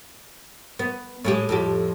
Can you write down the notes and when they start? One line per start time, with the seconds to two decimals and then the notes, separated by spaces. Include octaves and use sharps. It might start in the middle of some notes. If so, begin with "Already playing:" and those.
0.79 B3
1.25 A2 G#3 G4
1.49 F2 A2 G4